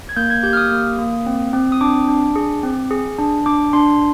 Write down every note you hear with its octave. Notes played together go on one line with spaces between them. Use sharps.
G#6
A#3 G6
G#6
G4 G6
F6
D#6
A#3
A#3
C4
C4
D#6
D4 D6
D4
G#4
C4
G#4
D4
D4 D6
D4 C6